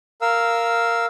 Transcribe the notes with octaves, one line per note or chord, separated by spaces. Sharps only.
A#4 F5 E6